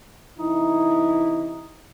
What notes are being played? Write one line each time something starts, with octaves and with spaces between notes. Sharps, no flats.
C3 E3 D#4 E4